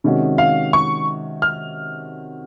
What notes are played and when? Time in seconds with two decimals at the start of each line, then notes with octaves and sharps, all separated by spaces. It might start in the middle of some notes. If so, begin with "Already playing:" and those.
0.04 C3 D#3 G#3 C#4 F#4
0.38 F5
0.73 C#6
1.42 F6